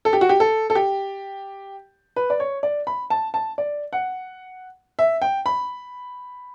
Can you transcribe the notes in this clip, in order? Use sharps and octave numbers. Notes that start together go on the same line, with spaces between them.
A4
G4
F#4
G4
A4
A4
G4
B4
D5
C#5
D5
B5
A5
A5
D5
F#5
E5
G5
B5